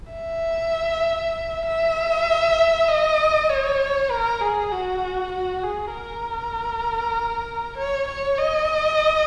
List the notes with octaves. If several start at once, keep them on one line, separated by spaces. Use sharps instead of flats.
E5
E5
D#5
C#5
A#4
G#4
F#4
F#4
G#4
A#4
C#5
C#5
D#5